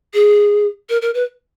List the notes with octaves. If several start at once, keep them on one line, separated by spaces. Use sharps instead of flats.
G#4
A#4
A#4
B4